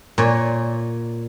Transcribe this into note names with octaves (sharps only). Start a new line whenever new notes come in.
A#2 C#5